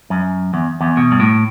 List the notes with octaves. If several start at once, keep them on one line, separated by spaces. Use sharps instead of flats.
F#2
E2
E2
B2
G2
A2